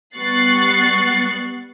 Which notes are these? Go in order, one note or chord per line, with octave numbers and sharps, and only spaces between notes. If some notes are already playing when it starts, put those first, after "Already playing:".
G3 B3 C#6 F#6 A6 C7